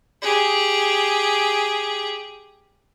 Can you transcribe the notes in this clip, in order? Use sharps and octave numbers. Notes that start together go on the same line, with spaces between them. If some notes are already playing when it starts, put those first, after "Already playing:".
G4 G#4